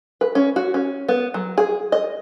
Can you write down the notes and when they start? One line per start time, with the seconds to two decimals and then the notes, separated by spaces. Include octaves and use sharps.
0.21 B4
0.35 C#4
0.56 F#4
0.74 C#4
1.09 B3
1.34 F#3
1.58 G#4
1.92 D#5